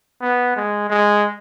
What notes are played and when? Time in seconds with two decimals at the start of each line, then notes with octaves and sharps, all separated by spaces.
0.22 B3
0.56 G#3
0.90 G#3